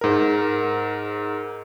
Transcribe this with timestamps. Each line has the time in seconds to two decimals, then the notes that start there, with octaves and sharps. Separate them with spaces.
0.01 G#2 A#4